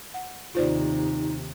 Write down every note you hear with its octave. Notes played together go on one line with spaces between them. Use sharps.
F#5
D#2 C3 D#4 F4 C5 D5